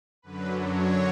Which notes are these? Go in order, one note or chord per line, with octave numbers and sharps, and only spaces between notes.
F#2 D3 F#3 B4
C#5